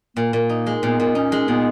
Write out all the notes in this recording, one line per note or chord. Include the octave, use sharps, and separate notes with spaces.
A#2 A#3
A#2
D#4
G#3
A#2 B3
A#2
C#4 D#4
G#3
A#2 B3